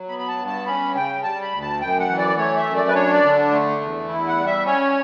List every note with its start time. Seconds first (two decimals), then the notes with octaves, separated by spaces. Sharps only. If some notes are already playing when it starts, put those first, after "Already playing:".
Already playing: F#3
0.09 B3 B5
0.19 B5
0.28 A5
0.38 G2
0.47 A5
0.66 C#4 B5
0.94 C#3 G5
1.23 G3 A5
1.42 B5
1.52 D2
1.61 A5
1.81 F#2 G5
1.99 F#5
2.09 E3
2.18 D5
2.37 A3 C#5
2.57 E5
2.67 F#2
2.76 D5
2.88 B4
2.94 D4 C#5
3.13 D5
3.23 D3
3.51 A3
3.81 E2
4.08 E4
4.28 F#5
4.37 G3
4.46 E5
4.65 C#4 C#5